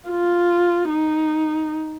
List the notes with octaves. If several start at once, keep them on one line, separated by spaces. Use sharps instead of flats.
F4
D#4